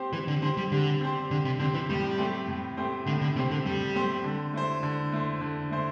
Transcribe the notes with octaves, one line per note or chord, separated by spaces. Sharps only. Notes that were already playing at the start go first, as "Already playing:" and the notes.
Already playing: C4 G4 C5
E3 G3
D3
D3 C4 G4 C5
G3
D3 G3
C4 G4 C5
D3 G3
C3
D3 C4 G4 C5
E3
A2 G3
A3 C4 G4 C5
A2
A3 C4 G4 C5
A2 D3
D3
C3 A3 C4 G4 C5
D3
A2 G3
A3 C4 G4 C5
D3
A3 E4 C5
D3
A3 E4 C5
D3
A3 E4 C5